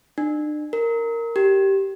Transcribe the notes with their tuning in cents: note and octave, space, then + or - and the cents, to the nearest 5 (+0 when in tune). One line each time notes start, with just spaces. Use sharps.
D4 +40
A#4 -10
G4 -10